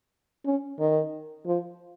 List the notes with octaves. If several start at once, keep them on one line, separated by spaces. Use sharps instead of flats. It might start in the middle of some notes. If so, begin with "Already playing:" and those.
C#4
D#3
F3